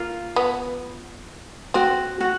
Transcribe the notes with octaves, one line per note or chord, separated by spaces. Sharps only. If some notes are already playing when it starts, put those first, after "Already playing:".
Already playing: A#3 F4
B3
C4 F#4
F#4